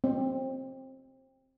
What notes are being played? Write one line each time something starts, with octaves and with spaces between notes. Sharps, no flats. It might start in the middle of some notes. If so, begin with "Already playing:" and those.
C4